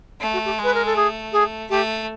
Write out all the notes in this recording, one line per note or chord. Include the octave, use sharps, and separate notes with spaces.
A3
F#4
G4
G#3
B4
A#4
A4
A3 G#4
G#4
A3 G4